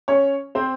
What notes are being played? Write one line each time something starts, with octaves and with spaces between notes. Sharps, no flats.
C#4 C#5
C4 C5